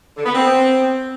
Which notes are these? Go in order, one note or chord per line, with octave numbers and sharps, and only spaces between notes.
D3
B3
C4